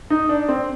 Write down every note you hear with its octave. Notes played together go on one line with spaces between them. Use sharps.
D#4
D4
C4